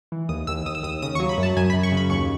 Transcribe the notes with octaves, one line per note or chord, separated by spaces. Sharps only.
E3
D#2 D#6
D#2 E6
D#2 D#6
E6
D#2 D#6
C#3 D#6
C#6
F#3
B5
F#2
A5
F#2 G#5
B5
F#2
C#6
C#3
B5
D#2 C#6